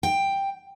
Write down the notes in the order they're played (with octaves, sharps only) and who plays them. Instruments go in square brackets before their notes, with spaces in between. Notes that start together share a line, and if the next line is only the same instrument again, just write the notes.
[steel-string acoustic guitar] G5